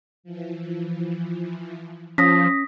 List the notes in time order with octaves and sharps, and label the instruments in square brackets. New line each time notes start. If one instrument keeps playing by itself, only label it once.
[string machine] E3 F3
[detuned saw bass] F3 [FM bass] C#4 [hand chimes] D#6 A#6 B6